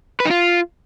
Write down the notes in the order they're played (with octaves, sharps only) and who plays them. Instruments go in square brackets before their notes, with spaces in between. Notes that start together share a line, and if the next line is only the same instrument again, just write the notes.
[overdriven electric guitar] B4
D#4
F4